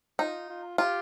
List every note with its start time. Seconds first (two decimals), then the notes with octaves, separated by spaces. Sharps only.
0.19 D#4 F4
0.50 F4
0.78 F4 G4